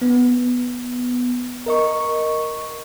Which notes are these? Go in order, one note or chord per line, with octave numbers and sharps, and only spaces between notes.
B3
A#4 D#5 C#6